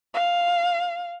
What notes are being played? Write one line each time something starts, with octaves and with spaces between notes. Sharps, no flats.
F5